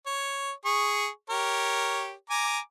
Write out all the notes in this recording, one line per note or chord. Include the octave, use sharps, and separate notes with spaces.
C#5
G#4 C#6
G4 A#4 C#5
G#5 A#5 D6